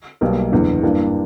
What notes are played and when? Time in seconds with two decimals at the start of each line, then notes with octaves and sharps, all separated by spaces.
0.21 B1 B2 G3 A#3
0.52 F#1 E2 D3
0.82 G2 E3 G3 A#3 D4